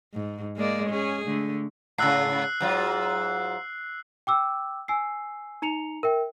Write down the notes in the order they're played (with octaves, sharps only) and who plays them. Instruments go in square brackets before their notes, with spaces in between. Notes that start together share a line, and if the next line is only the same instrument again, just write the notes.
[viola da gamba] G#2
G#3 A#3 D5
C#4 G#4
D3 A3
[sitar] G#2 C#3 [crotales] E6 F#6 C7
[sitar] G#2 F#3 F4
[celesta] G5 D6 E6
G#5 E6 C7
D#4 A#5 C#7 F7
A#4 E5 G5